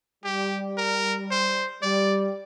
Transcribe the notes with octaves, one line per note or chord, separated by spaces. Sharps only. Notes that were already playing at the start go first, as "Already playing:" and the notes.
G3 G4
A#4
C5
G3 D5